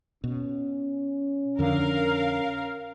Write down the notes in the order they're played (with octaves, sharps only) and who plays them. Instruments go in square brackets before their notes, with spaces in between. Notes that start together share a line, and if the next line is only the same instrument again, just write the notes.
[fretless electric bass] B2 [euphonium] C#4
[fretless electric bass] F2 D3 [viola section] A#4 F5